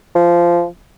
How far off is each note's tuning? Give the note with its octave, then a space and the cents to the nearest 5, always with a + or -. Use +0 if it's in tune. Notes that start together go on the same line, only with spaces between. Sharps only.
F3 -15